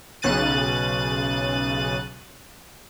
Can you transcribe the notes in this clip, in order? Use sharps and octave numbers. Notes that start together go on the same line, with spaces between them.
B1 C#3 F#6 A6 D#7